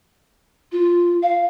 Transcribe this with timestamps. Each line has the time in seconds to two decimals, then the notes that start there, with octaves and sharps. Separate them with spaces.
0.72 F4
1.23 F5